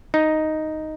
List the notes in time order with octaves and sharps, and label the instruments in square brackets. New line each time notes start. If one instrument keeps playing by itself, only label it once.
[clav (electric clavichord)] D#4